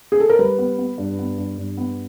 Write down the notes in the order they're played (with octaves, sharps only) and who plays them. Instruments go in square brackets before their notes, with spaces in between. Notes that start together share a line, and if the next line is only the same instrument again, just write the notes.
[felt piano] G#4
A4
A#4
G3 B4
B3
B3
G2
B3
G2
G2
B3